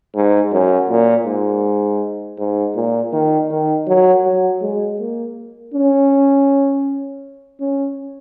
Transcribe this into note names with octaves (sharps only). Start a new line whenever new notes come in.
G#2
F#2
A#2
G#2
G#2
A#2
D#3
D#3
F#3
F#3
G#3
A#3
C#4
C#4